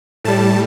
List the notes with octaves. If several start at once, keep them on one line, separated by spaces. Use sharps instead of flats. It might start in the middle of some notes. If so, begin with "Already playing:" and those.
A2 G3 A5